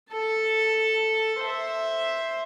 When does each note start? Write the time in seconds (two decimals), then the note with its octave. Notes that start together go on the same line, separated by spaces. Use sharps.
0.12 A4 A5
1.41 C5 E5